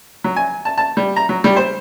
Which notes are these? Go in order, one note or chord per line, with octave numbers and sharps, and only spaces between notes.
F#3
G#5
A5
A5
G3
A#5
F#3
G3
C5